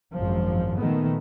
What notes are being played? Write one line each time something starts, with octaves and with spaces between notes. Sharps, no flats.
G#1 F#2 F3
A#2 D#3 A3 B3